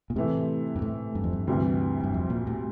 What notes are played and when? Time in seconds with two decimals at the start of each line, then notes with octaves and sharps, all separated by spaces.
0.10 A#2
0.16 A2 C3 E3 A3
0.76 G2
0.82 A2
1.15 G2
1.24 F2
1.33 G2
1.47 D2 G2 C3 E3 G3
2.04 G2
2.14 F2
2.30 A#2
2.47 A2